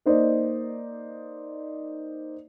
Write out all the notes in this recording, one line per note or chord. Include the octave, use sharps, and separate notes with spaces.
A#3 D#4 C5 D5 D#5